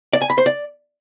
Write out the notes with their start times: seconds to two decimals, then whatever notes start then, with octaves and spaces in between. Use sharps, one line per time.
0.13 D5
0.22 G#5
0.30 B5
0.38 C5
0.46 D5